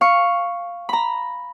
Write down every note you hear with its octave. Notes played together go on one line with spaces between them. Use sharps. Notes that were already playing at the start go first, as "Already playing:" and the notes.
F5 C#6
A#5 B5